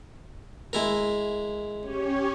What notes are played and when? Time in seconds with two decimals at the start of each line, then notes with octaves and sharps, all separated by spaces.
0.73 G#3 E4 A#4
1.81 C#4 G4 C#5